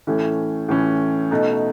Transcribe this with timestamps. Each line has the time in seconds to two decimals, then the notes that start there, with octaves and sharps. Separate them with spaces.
0.07 A2 E3 A3 C#4
0.69 A2 E3 A3 C#4
1.31 B2 A3 D#4